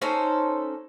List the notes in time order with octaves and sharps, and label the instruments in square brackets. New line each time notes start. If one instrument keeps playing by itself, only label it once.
[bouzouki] C#4 D#4 A4 C5